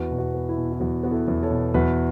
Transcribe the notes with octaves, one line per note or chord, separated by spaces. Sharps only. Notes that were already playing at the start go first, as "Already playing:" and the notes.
Already playing: E2 F#4 B4
B2
F#4
B3
E4
B2
E4
E2 F#4
B3 F#4
E4 A4
E2
A4 C#5
B2
E2 F#4 B4